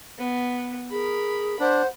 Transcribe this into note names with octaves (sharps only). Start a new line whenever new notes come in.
B3
G#4 A#4 B5
D4 C5 F#5